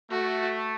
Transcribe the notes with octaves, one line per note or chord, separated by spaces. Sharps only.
A3 F#4